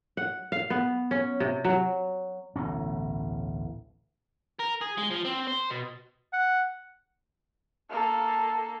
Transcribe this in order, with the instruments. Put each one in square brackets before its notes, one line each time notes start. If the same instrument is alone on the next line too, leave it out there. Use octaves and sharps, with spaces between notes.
[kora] F#5
F5
B3
C#4
C3
F#3
[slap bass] D1 A1 B2 C#4
[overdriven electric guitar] A#4
G#4
G#3
F3
C4
C5
B2
[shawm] F#5
[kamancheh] A#3 A4